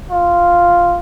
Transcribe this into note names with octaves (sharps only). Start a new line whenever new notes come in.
F4